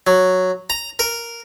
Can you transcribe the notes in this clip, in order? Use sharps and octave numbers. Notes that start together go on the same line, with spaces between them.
F#3
A#5
A#4